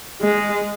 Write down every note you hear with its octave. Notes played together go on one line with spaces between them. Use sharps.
G#3